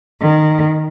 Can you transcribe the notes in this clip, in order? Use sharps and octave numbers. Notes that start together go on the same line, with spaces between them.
D#3